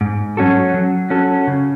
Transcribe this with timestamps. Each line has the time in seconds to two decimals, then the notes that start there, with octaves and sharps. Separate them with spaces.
0.01 G#2
0.37 F#3 C#4 F#4 A4
0.74 F#3
1.10 C#4 F#4 A4
1.47 C#3